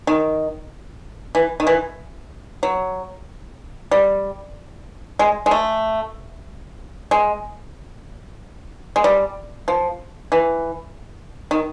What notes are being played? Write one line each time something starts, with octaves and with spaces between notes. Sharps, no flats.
D#3
E3
D#3
E3
F#3
G3
G#3
G#3
A3
G#3
G#3
G3
F3
E3
D#3